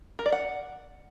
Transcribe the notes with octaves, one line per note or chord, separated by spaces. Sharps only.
A#4
D5
F#5